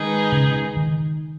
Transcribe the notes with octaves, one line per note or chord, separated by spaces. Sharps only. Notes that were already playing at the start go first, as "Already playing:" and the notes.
Already playing: D#3 G#3 D#4 G#4 B4
C#3
D#3